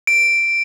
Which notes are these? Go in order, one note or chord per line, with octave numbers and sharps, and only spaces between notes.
D7